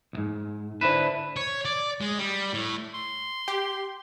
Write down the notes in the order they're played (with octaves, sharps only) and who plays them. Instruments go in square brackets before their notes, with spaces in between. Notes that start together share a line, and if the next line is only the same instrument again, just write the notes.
[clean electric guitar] B1 G#2
[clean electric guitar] D3 E4 B4 [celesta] C5 E7
[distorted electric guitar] C#5
D5
G#3
G3
A2
[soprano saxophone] C6
[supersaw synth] G4